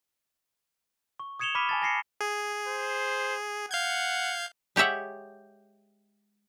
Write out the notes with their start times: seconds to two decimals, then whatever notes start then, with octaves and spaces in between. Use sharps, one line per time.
1.20 C#6
1.39 D#6 G#6 C#7 E7 F7 G7
1.55 B5 D6 F6 B6 D#7
1.69 G#5 A5 A6
1.82 G#5 A#6 C7 C#7
2.21 G#4
2.67 C5
3.71 F5 F#5 G6 G#6
4.76 G#3 G4 C#5 E5 F#5